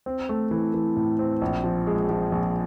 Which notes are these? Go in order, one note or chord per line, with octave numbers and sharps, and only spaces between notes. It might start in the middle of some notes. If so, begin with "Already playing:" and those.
C4
A3
E3
E3
A2
C4
A#1
F3
G#3
F3
A#1